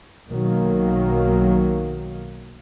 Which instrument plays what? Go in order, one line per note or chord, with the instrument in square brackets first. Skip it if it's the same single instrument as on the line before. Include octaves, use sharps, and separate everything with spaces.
[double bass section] B1 D#3 F#3 A#3